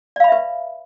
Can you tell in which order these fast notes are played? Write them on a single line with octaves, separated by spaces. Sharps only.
D5 F5 B5 E5 B4